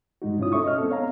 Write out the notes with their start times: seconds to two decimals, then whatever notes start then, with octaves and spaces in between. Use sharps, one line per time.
0.22 G2 G#3 D#4 F#4
0.39 B2 C#4 E4 F4 C#5 D#6
0.52 C#4 A4 C#5 E5 C#6 D#6
0.64 D#5 F6
0.78 B3 C4 A4
0.91 C#5 F5 A#5